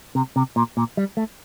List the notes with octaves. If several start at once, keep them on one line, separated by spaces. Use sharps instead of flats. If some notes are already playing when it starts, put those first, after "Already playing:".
C3
C3
A#2
A#2
G3
A3